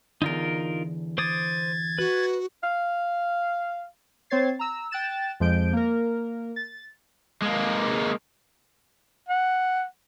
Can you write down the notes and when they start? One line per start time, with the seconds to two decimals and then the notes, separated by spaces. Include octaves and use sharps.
0.22 E2 D3 D#4 F4 A#4
1.18 C5 D6 D#6 G#6 A6
1.98 F#4 B4
2.63 F5
4.30 C4 C5 C#5 G#6 A6 C7
4.59 A#5 E6
4.91 G5 F#6 A6 E7
5.40 F2 F3 G#3 G6 D7
5.73 A#3 A#4
6.56 A6
7.42 G#3 A#3
9.29 F#5